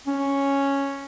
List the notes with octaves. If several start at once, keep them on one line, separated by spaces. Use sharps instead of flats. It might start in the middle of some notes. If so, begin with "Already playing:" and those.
C#4